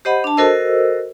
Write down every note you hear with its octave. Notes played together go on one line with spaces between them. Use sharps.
G4 C5 D#5 F#5 B5
D4 A5
F#4 A4 A#4 C5 D#5 E6